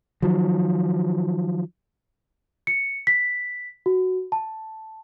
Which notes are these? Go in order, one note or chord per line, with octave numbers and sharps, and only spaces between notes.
D#3 F3 F#3
C#7
B6
F#4
A5